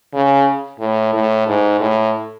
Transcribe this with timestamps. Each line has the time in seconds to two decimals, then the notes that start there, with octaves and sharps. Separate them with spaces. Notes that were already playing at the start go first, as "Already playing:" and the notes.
0.14 C#3
0.80 A2
1.14 A2
1.47 G#2
1.81 A2